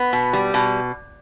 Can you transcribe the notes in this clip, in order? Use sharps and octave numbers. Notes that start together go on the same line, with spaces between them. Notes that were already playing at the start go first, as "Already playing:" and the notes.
Already playing: B3
B2
G3
B2